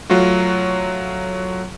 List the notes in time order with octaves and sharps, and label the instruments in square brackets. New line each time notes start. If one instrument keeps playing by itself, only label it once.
[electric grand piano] F#3 A3 F4 F#4